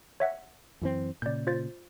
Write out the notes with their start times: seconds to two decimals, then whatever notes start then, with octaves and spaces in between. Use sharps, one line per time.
0.20 C#5 E5 F#5
0.82 F#2 E3 C4
1.22 A#2 C#3 D5 G6
1.47 F4 C5 A6